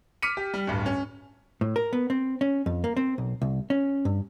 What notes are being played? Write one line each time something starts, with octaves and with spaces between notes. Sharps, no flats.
D6 F6 B6 C#7 D#7
G4
G3
D1 G2
C#4
A2
A#4
B3
C4
C#4
F2
A#3
C4
B1
C2
C#4
G2